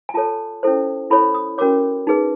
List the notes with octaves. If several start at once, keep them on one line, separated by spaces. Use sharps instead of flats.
G#5
F4 A4 C#5 A5
C#4 E4 A4 C5
E4 A4 C#5 B5
D#6
C#4 F#4 A#4 C#5 D6
D#4 G#4 B4